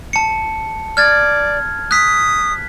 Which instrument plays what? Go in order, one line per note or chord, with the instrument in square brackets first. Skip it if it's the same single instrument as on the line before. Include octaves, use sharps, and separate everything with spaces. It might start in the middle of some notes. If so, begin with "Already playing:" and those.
[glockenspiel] A5 C#7
[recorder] D5 [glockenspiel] F6 G#6 A6
[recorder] D#6 [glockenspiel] F#6 B6